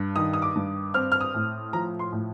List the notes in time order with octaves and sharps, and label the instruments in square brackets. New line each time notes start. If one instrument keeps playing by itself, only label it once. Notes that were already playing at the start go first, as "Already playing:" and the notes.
Already playing: [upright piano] G2
D#3 D#6
D#6
D6
G2
C4 F6
F6
D#6
A2
F3 A#5
C6
A2